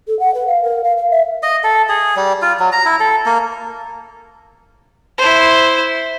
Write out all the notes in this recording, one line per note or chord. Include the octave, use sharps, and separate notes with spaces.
A4
F#5
B4
F5
A#4
F5
F5
E5
D#5
A4
G#4
G3
F4
F#3
A#5
E4
A4
A#3
E4 C5